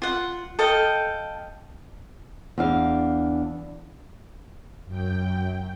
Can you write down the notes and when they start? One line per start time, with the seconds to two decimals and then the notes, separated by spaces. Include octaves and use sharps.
0.02 F4 F#5
0.59 A4 D#5 F5 G5
2.58 E2 D4 F5
4.85 F#2 G5